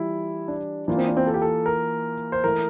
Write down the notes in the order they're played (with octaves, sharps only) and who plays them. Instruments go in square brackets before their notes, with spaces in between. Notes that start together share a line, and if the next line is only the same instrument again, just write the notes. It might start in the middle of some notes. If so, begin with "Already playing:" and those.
Already playing: [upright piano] E3 G3 F4 [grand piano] E4
[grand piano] D4
[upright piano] E3 A#3 F4 [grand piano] D4
[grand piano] C4
D4
C4
A4
G4
A4
A#4
C5
[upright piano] E3 A3 E4 [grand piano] A#4